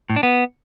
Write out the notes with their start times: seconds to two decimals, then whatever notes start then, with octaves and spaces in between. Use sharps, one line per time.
0.10 A2
0.16 D4
0.23 B3